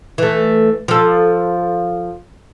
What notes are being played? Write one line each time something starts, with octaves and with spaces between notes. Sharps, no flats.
E3 A3
F3 A4